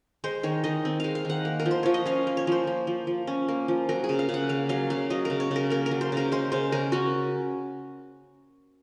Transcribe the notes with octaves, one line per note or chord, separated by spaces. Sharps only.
G#3 C5
D#3 C#5
D#3 D#5
C4
G#3 F5
F5
D#3 F#5
A#3
A#4
F3
C5
F3 C#5
D#5
C#4 F5
A#3
C#5
F3 C5
A#3
F3
F3
C#4
A#3
F3
F#3 A#4
G#4
C#3
F5
C#3
F#5
A#3 F5
F#3 F5
C#3 F5
F#3 D#5
C#3 A#4
C#5
C#3 A#4
A#3 A#4
A#4
F#3
C5
C#3 A#4
G#3 C5
C#3 C5
C#3 A#4
C#4 F#4